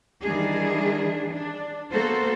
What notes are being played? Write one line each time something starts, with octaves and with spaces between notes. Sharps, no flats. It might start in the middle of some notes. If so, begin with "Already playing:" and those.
D#3 E3 G3 D4 E4 G#4
D4
A#3 B3 F#4 A4 C5